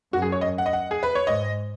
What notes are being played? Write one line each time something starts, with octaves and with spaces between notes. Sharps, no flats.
F#2 F#4
G#4
C#5
D#5
F#5
D#5
F#5
G#4
B4
C#5
G#2 D#5